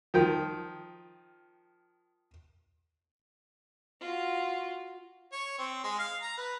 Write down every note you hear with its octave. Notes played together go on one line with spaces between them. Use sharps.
D#3 F3 G5
F4 F#4
C#5
C4
G#3
F5
A#5
B4